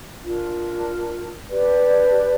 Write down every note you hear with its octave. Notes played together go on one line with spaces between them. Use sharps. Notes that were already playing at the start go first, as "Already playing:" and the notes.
D4 F4 A#4
D4 G4 B4 D5